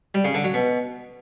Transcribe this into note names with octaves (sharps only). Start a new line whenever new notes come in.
G3
C#3
D3
F#3
B2